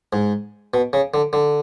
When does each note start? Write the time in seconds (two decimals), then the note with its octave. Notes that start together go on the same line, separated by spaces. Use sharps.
0.13 G#2
0.74 B2
0.93 C#3
1.14 D3
1.33 D3